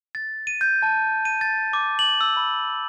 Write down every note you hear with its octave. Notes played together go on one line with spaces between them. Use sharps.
A6
D#7
G6
A5
D#7
A6
D6
F#7
E6
B5